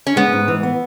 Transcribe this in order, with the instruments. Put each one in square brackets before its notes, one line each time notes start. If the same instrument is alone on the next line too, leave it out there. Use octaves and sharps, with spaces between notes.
[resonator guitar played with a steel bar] C#4
[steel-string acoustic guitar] G#3 [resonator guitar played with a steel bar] B3
[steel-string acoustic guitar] G#2
E3
B3